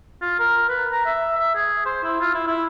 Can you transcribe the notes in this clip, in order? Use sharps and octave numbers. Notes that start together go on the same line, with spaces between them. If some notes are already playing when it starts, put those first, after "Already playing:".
F4
A#4
B4
A#5
E5
E5
G#4
C5
E4
F4
E4
E4